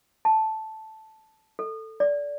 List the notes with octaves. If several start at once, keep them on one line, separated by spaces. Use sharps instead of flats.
A5
A4
D5